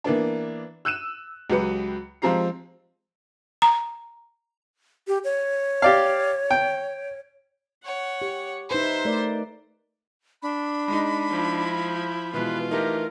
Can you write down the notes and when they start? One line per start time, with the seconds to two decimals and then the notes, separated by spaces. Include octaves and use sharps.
0.04 E3 A#3 B3 D4
0.85 E6 F#6 D#7 E7
1.50 C#2 F#3 G4 B4 C#7
2.22 F3 G#3 C4 G4 A#5 C7
3.62 A#5
5.08 G4
5.24 C#5
5.82 G4 D5 F5
6.51 G5
7.82 C#5 F#5
8.22 G4
8.71 D#4 B4 C5 E5
9.05 A3 A#4 D5
10.42 D4 B5
10.88 G#3 D#4
11.30 F3 E4
12.33 B2 E3 G#3 F4 B4
12.71 E3 A3 D#4 G4 A#4